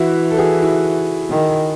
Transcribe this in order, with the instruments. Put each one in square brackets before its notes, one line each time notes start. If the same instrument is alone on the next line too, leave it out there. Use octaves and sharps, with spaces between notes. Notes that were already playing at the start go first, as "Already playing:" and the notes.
Already playing: [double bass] E3 [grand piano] E4 F#4
[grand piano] A4
F#4 G#4
E4 F#4
[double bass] D#3